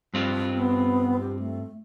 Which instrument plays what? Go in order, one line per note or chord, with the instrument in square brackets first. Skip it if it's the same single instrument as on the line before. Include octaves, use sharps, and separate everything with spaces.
[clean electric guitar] G2 C4 F4
[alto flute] B3
G4
A3